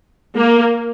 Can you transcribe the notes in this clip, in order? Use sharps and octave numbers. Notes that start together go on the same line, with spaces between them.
A#3